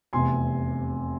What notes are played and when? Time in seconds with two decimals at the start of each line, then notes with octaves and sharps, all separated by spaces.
0.13 F1 E2 C3 G#5 C6